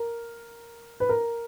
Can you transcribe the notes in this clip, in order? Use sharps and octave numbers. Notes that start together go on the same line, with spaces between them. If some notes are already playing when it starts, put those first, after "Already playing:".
Already playing: A#4
B4
A#4